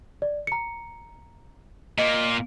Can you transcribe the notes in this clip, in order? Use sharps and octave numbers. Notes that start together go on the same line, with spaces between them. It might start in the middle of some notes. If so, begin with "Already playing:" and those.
D5
A#5 C#7
A#2 A#3 D#5